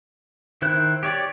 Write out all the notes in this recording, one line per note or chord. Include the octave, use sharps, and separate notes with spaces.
D#3 E4 C5 F#6
G4 C#5 D5